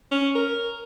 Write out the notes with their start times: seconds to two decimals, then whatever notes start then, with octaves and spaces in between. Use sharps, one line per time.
0.12 C#4
0.35 A#4